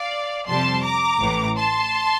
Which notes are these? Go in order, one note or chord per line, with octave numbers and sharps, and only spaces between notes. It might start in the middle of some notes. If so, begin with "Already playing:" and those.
Already playing: D5 F5
F2 C3 G3 A5 C6
A#5 D6
A1 A2 E3
A5 C6